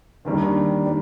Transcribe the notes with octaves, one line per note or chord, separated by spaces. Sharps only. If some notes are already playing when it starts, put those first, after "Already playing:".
D#2 D#3 G3 A#3 D4
D#3 G3